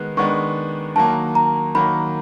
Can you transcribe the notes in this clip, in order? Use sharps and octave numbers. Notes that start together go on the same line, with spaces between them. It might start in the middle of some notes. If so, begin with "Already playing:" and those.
Already playing: D#3 G#3 B3 F#6
D#3 G#3 B3 D4 C#6
D#3 F#3 A#3 A5
A#5
D#3 F#3 A#3 B5